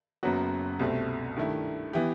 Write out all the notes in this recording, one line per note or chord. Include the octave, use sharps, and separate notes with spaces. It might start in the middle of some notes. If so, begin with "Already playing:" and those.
F#1 F#2 F#3 B3 F#4
C2 B2 A3 C4
G2 D#3 A3 E4
E3 B3 E4 G4